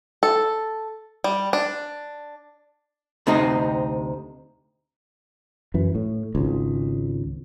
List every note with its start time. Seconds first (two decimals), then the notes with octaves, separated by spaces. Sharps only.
0.23 A4
1.24 G3
1.53 D4
3.27 D2 C3 C4 D#4
5.74 F#2 E3
5.95 A2
6.35 G#1 C#2